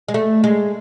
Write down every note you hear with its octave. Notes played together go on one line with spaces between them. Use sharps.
G#3
A3
G#3